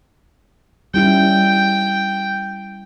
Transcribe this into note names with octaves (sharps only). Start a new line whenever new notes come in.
G3 C#4 E4 G5